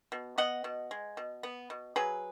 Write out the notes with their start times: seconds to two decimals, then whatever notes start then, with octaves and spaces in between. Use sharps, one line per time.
0.12 B2
0.38 B3 D#5 F#5
0.64 B2
0.91 G#3
1.17 B2
1.43 B3
1.70 B2
1.96 F#3 G#4 B4